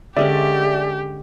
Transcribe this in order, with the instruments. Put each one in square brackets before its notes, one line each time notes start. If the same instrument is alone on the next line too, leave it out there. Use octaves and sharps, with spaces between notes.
[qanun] D3 G#3 C#4 [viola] G4 [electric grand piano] D5 E5